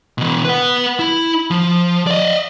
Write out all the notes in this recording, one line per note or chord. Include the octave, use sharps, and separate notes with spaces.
B2 E3
B4 F#5
E4
F3
D5 D#5